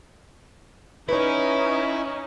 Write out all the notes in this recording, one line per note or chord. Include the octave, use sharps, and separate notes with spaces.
C#4 D#4 E4 B4 C#5